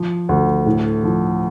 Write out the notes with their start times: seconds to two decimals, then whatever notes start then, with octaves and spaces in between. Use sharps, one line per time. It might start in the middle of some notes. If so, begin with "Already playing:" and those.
Already playing: F3
0.29 D2
0.66 A2
1.04 F3